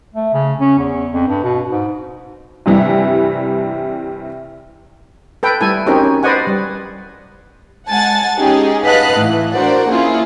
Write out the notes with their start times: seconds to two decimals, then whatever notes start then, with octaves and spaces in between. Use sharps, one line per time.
0.15 A3
0.34 C#3
0.60 C#4
0.78 E2
1.14 F2
1.28 G2
1.43 B2
1.69 G#2
2.66 G2 C3 E3 G3
5.43 A4 B4 G5
5.61 G3 A3 E4 A4 G#5
5.86 C4 C#4 D#4 F#4 G4 A#4
6.03 C#4
6.23 B4 C5 D5 D#5 F#5 G#5
6.47 G3
7.89 G#3 F#5 G#5 A5 A6
8.38 C#4 D#4 G4 G#4
8.84 B4 D#5 F5 F#5 A5 F#6
9.15 A2 E3
9.53 D4 F#4 A#4 C5 D5 F#5
9.88 A#3 C#4 E4 F4 G#4